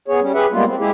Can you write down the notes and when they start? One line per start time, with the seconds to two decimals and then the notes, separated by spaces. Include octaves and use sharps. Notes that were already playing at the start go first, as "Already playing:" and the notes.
0.08 B3 G#4 C#5
0.21 G3 C#4
0.34 G4 G#4 B4 E5 F#5
0.52 G3 G#3 A#3 B3 F4
0.66 C4
0.79 G#3 E4 G4 G#4